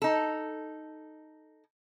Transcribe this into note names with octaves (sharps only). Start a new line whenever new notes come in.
D#4 A4